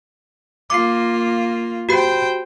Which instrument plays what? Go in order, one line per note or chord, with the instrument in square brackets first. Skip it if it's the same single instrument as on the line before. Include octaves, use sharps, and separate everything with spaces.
[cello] A#3 F4 [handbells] D6 C7
[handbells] F#4 G4 B5 [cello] C5 G5